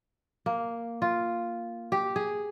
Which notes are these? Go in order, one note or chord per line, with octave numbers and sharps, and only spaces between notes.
A#3
F4
G4
G#4